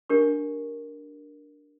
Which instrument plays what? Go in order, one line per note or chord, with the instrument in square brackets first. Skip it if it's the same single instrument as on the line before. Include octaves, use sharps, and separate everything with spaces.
[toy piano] D4 G4 A#4 C#6